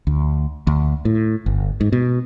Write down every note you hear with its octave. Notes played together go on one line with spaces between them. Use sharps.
D2
D2
A2
G1
G#2
B2